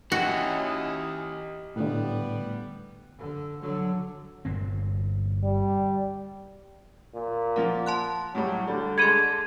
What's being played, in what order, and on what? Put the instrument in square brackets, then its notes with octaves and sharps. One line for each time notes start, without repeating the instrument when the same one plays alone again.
[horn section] C#4 D#4 E4 [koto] F#4 [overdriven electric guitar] G4 D#5
[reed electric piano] A2 D3 [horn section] G3 B3
[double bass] D3
D3 F#3
[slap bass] G1 A#2 C4
[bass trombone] G3
[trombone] A#2
[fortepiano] F3 A#3 [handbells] F#5
[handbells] A5 C6 F#6
[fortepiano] A2 G3 [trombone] F#3
[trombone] D3 [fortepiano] G3
[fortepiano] G#3 B5 [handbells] G#4 A4 C6 [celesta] G#6 D#7